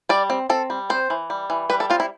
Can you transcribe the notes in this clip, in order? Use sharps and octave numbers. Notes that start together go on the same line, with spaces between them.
G3 D5
C4
C4 A4
G3
C4 C5
E3
G3
E3
G3 B4
A4
C4 F4
E4